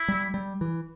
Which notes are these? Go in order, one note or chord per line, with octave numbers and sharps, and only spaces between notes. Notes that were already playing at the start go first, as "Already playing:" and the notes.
Already playing: E4
G3
G3
E3